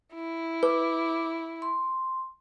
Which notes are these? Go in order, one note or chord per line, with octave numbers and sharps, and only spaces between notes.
E4
B4 D6
C6